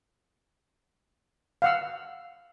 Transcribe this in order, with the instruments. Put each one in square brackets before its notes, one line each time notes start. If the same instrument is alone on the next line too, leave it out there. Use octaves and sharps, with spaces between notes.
[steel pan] F5 F#5 E6